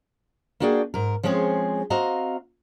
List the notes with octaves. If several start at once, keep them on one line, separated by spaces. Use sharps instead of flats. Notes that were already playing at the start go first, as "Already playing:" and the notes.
A#3 D4 F#4 G#4 D5 G5
G#2 A#4
F3 G#3 C4 C#4 G#4
C4 F#4 D#5 F5 A#5